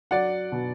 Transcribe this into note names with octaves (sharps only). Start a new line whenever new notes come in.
F#3 D5 F#5
B2